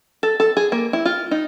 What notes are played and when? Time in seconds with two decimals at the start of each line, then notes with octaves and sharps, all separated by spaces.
0.23 A4
0.40 A4
0.57 G#4
0.72 A#3
0.93 E4
1.05 F4
1.31 D#4